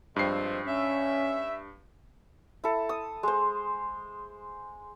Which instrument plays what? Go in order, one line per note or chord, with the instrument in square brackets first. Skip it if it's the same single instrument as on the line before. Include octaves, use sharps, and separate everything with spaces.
[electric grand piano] G2 C7 [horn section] F3 G#3 C4
[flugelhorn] C#4 [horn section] E5
[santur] E4 A4
D#6
G#3 C5